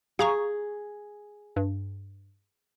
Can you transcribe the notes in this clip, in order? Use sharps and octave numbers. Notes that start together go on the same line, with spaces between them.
G#4 F5 A#5 C#6
G2